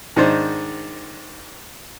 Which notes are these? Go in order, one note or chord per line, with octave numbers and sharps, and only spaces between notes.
G#2 D#3 D4 C5